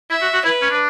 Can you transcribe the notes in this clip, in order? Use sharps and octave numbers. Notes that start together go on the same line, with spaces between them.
E4 E5
F#4
F#4
E4 B4
C#4
D4